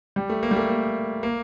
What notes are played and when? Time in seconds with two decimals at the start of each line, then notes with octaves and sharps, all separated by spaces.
0.16 G3
0.29 A3
0.43 A#3
0.51 G3
0.56 A3
0.69 A#3
1.23 A#3